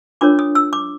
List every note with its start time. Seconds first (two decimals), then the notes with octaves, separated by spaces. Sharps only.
0.21 D4 F4 A#4 C#5 D6
0.39 D#6
0.55 E6
0.73 D6